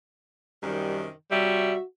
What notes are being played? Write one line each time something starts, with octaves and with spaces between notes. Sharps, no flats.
F#2 C3 D#3 G3
C3 G3 F#4 C#5 E5